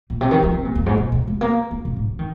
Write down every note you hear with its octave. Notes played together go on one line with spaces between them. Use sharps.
A#2
C3
D#3
F3
C3
A#2
F2
G#2
A#2
C3
G#3
A#3
D#4
C3
G#2
F3
D#3